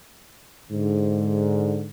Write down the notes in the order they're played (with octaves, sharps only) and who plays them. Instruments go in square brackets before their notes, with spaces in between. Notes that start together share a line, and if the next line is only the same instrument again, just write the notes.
[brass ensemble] G#2 D3